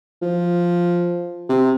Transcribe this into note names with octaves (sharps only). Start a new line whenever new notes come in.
F3
C3